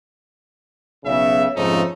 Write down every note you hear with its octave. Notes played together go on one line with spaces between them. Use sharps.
B1 C#3 E5
F2 G#2 C#3 F3 A3 D#4